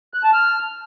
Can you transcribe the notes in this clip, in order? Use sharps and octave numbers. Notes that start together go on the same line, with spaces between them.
F#6
A5
F6